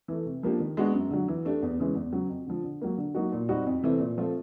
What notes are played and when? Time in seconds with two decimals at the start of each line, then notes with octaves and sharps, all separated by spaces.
0.08 E3 A3
0.26 C3
0.43 F3 A#3 D4 G4
0.60 D#3
0.77 G#3 B3 D4 F#4
0.94 F#2
1.11 D3 F#3
1.28 E3
1.45 A3 D4 G4
1.62 E2
1.79 C#3 E3 G#3 C#4
1.95 E2
2.13 C#3 F#3
2.29 F2
2.47 D3 F3
2.64 D3
2.81 F#3 A#3
2.98 D3
3.15 F#3 A#3 D#4 F#4
3.32 A#2
3.49 G3 C4 D#4 F#4
3.67 F2
3.83 C3 E3 A3 C4
4.00 A#2
4.18 F3 A3 C4 F4